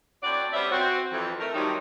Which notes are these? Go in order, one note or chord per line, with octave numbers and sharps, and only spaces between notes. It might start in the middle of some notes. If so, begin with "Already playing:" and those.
A2 C4 F#4 D5
G3 B3 C#4 E4 C5 E5
C4 F#4
F2 E3
A3 A#4
A2 C3 D#3 F#3 G3 D#4